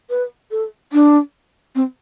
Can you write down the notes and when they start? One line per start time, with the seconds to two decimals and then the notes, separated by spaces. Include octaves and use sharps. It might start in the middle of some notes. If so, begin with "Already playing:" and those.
0.10 B4
0.51 A4
0.93 D4
1.75 C4